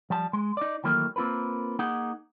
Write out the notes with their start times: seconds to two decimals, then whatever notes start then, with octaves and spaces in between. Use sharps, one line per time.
0.10 F3 G3 A5
0.33 G#3
0.57 D#4 D5
0.84 D#3 E3 F#3 A3 A#3
1.16 A#3 C4 F4 A#4 B4
1.79 A#3 D#4 G#4 F#5